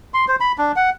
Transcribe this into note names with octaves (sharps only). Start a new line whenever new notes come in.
C6
C5
B5
D4
F#5